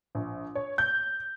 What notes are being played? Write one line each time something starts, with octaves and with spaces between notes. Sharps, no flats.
A#1
C#5
G6